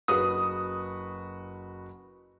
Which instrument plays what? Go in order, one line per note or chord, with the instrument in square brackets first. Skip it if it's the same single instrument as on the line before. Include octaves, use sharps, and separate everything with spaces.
[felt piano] F#1 F#4 B4 [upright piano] D#6